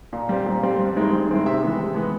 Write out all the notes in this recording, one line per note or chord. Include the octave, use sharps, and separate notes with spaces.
A#2
G3 C4
A#2
G3 C4
G2
D#3 G#3 C4 E4
G2
D#3 G#3 C4 E4
C3 E5
E3 G#3 B3
C3
E3 G#3 B3